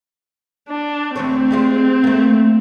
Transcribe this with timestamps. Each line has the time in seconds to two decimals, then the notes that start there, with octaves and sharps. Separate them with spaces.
0.69 D4
1.16 D2 E3 C4 C#5
1.51 G3 G#3 F4
2.04 A3 A#3